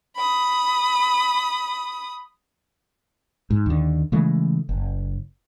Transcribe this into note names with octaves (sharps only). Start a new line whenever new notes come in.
B5 D#6
G#2
D#2 D3
C#3 E3 G#3 A3
F#1